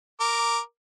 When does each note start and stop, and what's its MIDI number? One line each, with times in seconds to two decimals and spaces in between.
0.20 0.59 70
0.20 0.59 86